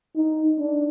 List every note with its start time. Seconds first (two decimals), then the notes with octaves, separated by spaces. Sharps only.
0.16 D#4
0.59 D4